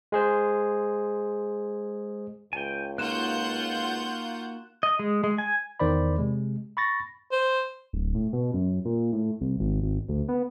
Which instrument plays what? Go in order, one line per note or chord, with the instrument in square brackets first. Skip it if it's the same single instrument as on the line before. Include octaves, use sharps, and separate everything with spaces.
[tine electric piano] G#3 G#4 C5
[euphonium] C#2 [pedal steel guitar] G5 G#5
[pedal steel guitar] A#3 D#4 F#4 [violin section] F4 F#5 G6 [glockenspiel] F#6 E7
[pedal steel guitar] D#5
G#3
G#3
G#5
[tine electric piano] E2 D#3 C5 D5 B5
C3 G#3
B5 C#6 A6 A#6
[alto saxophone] C5
[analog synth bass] D1
A2
B2
F#2
A#2
A2
C2
G#1
G#1
D2
B3